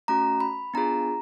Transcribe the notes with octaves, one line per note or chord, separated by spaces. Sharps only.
A3 C#4 F#4 A#5
B5
B3 D4 F4 G#4 A#5